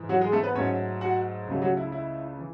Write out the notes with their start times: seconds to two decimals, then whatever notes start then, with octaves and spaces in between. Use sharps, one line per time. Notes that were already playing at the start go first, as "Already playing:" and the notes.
Already playing: G#2 E3
0.09 F#3 F#4
0.21 G#3 G#4
0.32 A3 A4
0.43 B3 B4
0.55 G#2 F#3 A3 C#4 C#5
1.01 F#4 F#5
1.47 C#2 C#3 F#3 A3
1.62 F#3 F#4
1.77 E4
1.92 E4
2.39 E3